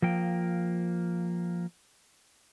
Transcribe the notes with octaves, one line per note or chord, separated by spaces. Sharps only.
F3 A#3 G5